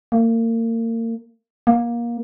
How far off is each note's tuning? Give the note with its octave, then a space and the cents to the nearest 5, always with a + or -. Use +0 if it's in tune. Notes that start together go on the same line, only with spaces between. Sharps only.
A#3 -35
A#3 +20